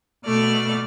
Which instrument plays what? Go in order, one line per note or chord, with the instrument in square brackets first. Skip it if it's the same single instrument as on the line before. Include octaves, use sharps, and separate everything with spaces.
[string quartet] B2 A3 D5 F6